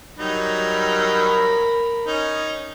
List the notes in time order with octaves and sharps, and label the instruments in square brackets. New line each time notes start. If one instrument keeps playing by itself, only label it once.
[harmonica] F#3 G3 D#4 [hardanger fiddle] A#4 B5
[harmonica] C#4 D#4